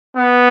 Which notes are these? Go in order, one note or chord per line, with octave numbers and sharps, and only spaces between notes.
B3